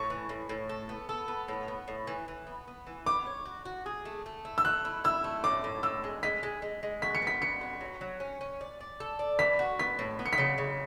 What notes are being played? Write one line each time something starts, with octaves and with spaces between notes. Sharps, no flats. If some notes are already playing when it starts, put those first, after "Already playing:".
Already playing: A2 C#6
E3
A2
A2
A4
B3
A4
B3
A2
B3
A2
E3
E3
B3
B3
E3
B3 D6
C#5
F#4
F#4
G#4
A3
A3
E4
E6
A3 F#6
E4
E4 E6
A3
A2 D6
A2
A2 E6
G#3
G#3 B6
G#3
G#3
G#3
F#4 B6
C#7
B3 B6
B3 C#7
F#4
F#3
F#3
C#4
C#4
D5
D5
A4
D5
E3 B6
F#4
B3 B6
A2
B3
C#7
B6
C#3 C#7
C#3